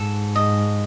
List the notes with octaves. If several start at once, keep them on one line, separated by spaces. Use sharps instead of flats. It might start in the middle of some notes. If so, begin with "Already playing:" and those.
Already playing: G#2 A4
D#5